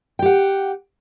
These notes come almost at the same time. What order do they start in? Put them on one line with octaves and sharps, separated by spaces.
G5 G4 F#5